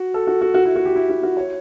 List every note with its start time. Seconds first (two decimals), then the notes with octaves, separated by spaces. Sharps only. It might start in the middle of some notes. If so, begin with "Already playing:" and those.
Already playing: F#4
0.14 A4
0.27 F#4
0.41 F#4
0.54 F#4
0.65 E4
0.76 F#4
0.85 G4
0.96 E4
1.09 F#4
1.23 F#4
1.37 C#5